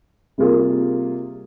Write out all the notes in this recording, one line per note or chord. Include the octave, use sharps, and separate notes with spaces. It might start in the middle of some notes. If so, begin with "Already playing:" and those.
C3 G3 A#3 F4 G#4